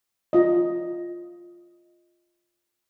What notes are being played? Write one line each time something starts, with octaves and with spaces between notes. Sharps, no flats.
F4 D#5